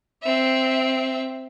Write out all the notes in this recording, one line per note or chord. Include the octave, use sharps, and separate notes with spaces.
C4 E5